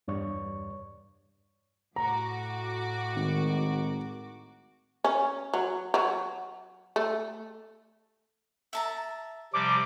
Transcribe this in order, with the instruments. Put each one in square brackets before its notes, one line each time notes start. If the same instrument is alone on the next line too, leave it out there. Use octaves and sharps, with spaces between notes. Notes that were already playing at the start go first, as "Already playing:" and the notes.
[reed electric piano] E2 G2 C#5 D5 C#6
[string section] A2 F#4 D6 [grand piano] A#5
[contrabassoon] G#1 [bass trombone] D#3
[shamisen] C#4
F#3
F#3
A3
[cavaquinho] E5 A5 A#5
[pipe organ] C3 F3 G3 [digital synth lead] D6